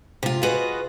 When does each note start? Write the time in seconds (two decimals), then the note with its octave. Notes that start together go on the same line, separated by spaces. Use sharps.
0.23 C3 F4
0.43 F4 F#4 G#4 B4 D#5